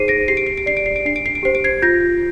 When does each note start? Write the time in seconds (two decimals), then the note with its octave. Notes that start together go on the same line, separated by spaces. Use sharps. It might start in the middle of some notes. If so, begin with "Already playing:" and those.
Already playing: D#4 G#4 C5 C7 D#7
0.08 A#6 D7
0.28 G4 C7
0.37 D7
0.47 C7
0.58 D7
0.66 D5 C7
0.77 D7
0.86 C7
0.96 D7
1.05 D4 C7
1.16 D7
1.26 C7
1.35 D7
1.43 G4 C5 C7
1.55 D7
1.64 G#6 C7
1.82 F4 G6 A#6